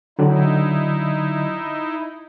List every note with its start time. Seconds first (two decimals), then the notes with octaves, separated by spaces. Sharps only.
0.19 D3 F#3 D#4 E4 D5